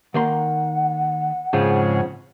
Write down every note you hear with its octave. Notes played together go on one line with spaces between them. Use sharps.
D#3 A#3 F#5 C6
F2 G#2 C#3 F3 G#3